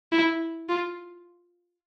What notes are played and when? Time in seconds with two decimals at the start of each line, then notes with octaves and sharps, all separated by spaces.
0.12 E4
0.69 F4